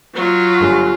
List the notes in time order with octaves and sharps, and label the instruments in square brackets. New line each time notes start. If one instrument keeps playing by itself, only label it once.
[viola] F#3 [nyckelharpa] F4
[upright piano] G1 G3 G#5